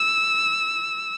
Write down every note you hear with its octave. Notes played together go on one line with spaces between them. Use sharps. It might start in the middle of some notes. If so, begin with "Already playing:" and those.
Already playing: E6